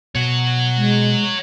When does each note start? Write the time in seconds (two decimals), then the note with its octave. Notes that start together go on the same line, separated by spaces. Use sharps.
0.15 B2 C#5 F#5
0.77 G#3